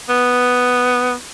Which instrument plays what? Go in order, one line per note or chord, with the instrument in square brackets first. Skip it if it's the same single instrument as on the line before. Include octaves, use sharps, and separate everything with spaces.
[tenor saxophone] B3